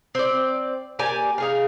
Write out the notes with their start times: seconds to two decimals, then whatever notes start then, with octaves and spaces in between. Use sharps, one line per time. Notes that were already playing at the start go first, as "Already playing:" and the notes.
0.15 C4 D5
0.99 A#3 G4 D5 G#5
1.38 D#4 G#4 F5